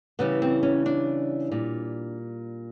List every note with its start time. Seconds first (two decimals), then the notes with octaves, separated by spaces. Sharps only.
0.19 C#3 E3 G3 B3
0.42 C4
0.63 C#4
0.86 D4
1.51 A#2 G3